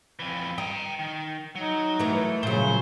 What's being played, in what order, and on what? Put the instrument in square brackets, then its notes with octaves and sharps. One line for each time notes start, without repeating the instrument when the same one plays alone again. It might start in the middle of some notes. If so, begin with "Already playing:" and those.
[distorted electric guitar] F2 E3
[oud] D#5 [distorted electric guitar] G5 A#5
[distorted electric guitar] D#3
[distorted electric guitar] F#3 [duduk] D#4
[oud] E3 A#4 [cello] A3
[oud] A#2 F#3 [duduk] C#3 [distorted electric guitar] C5